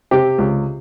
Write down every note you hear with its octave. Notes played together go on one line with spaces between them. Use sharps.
C3 G4
C#2